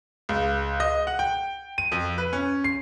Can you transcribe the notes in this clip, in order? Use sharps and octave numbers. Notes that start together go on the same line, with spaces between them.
C#2
D#5
F#5
G5
D#7
F2
B4
C#4
C7